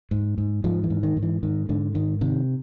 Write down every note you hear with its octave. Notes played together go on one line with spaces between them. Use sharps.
G#2
G#2
G#2 F3
E3
G#2
D#3
G#2
E3
G#2 D#3
G#2 D3
G#2 D#3
C3 D#3